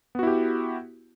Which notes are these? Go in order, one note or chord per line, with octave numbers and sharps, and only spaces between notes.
B3 E4 F#4 G4